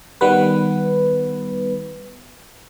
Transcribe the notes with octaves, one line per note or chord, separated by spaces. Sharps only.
D#3 G3 B3 B4